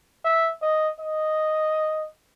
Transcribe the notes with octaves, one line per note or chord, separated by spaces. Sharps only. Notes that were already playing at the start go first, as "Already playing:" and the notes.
E5
D#5
D#5